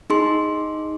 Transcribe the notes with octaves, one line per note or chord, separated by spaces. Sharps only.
D#4 G#4 C6